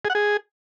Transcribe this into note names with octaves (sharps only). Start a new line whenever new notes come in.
G#4
F#5
G#4